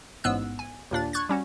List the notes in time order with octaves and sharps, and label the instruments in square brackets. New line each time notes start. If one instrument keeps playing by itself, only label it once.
[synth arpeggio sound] A1 G#2 B3 E6 F#6
G#5
D#2 A#2 D4 A6
C#6 F#6 G#6 A6
G3 C#4 F#4